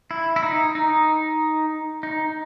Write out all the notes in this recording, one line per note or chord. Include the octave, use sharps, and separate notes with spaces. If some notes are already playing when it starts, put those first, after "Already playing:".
E4
E4
D#4
D#4
D#4